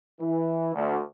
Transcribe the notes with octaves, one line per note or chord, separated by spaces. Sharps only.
E3
D2